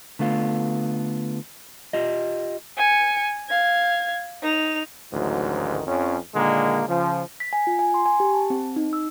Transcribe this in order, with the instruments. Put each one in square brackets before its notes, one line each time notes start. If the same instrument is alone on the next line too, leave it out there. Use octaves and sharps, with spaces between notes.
[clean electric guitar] D3 A3 B3 F4
F4 G4 D#5
[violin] G#5 C#7
F5 G#6
D#4 F7
[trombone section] A1 D2 G#2 D#3 F#3
F2 C#4
A#2 D3 D#3 G#3 A#3
C#3 F3
[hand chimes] B6
G#5
F4
G#5
C6
G#5
G4
A5
C4
D#4
E6